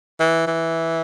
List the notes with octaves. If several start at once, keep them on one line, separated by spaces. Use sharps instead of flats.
E3
E3